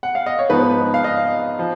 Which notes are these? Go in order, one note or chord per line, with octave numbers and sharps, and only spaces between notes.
F#5
F5
D#5
C#5
G#2 F3 B3 D#4 B4
F5
D#5
F3